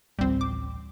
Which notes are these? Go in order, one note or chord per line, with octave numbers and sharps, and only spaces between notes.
A1 D2 F3 G3 C4
D6